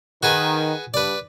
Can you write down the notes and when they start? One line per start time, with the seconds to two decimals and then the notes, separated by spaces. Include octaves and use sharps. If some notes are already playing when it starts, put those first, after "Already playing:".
0.23 D#3 F#4 G#4 B4
0.94 G2 B4 D5